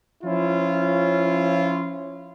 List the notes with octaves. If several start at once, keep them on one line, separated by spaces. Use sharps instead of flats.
F3 C#4 E4 F4